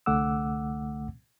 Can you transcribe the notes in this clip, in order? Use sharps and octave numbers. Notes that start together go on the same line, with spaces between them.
C2 D3 A3 F#5 D6 E6